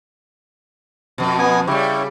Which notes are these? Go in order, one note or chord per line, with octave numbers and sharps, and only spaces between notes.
F2 B2
B3 G#5 D#6
C#3 G3 E4 G4 C#5